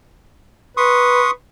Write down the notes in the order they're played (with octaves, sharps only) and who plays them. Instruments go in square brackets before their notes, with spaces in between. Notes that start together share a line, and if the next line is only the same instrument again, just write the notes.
[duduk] B4 [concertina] C6 C#6 D#6